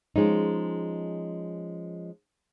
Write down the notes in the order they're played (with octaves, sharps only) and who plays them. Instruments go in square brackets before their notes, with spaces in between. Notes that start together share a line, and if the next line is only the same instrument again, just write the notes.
[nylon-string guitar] F3 G#3 C#4 D#4